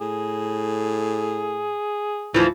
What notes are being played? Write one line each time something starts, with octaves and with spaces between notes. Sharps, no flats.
A2 G#4
D2 E3 F3